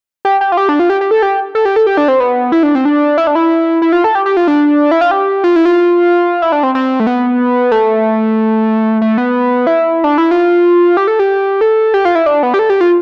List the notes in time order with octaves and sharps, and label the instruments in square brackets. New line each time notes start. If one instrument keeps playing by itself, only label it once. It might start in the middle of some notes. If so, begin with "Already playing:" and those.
[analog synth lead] G4
G4
F4
G4
D4
F4
G4
G4
A4
G4
A4
G4
A4
G4
D4
C4
B3
E4
D4
C4
D4
E4
D4
E4
E4
F4
A4
G4
G4
F4
D4
E4
F4
G4
F4
E4
F4
E4
D4
C4
C4
A3
B3
A3
A3
B3
E4
D4
E4
F4
G4
A4
G4
A4
G4
F4
E4
D4
B3
G4
A4
G4
F4